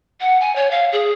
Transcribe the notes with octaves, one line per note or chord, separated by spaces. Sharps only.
F#5
G#5
C#5
F5
G#4